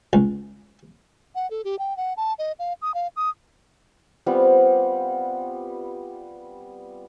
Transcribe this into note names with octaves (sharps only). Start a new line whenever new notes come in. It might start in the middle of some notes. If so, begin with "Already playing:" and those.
C#2
F#5
A4
G4
G5
F#5
A5
D#5
F5
D#6
F5
D#6
G3 B3 C4 F4